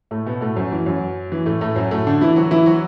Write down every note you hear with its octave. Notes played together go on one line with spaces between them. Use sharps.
A2 A3
B2 B3
A2 A3
F#2 F#3
E3
F#2 F#3
E3
A2 A3
A2 A3
F#2 F#3
A2 A3
D3 D4
E3 E4
F#3 F#4
E3 E4
F#3 F#4